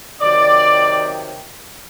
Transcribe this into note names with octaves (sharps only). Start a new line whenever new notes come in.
C3 D#3 F#3 D5